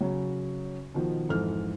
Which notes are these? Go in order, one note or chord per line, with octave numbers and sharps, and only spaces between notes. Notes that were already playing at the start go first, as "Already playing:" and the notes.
C#3 F#3
B2 D#3 F3
F2 G#2 E3 A4 F6